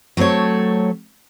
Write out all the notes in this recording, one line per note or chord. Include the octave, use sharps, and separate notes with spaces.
F#3 A3 C4 A4 C#5